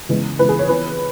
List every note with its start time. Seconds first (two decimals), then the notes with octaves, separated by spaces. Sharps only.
0.09 C#3 E3 G#3 B3
0.39 C#3 E3 G#3 B3 B4
0.49 G#4
0.59 C#5
0.69 E3 B3 B4